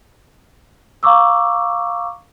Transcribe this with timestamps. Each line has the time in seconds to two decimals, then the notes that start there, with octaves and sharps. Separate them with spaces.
1.03 F5 A#5 C#6 D6 E6